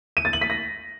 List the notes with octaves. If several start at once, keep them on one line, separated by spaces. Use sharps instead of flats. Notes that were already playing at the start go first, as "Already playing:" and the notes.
D#7
A6
F#7
B6
A#6